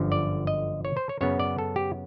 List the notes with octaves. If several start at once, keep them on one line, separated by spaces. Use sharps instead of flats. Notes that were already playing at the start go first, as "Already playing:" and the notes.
Already playing: G1 F#2 D3 F3
D5
D#5
C#5
C5
C#5
F#2 C#3 F#3 B3 C#5
D5
A4
G4